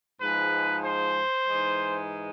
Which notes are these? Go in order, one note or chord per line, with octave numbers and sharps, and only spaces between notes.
G#2 F3 G#3 B4
C5
G#2 E3 G#3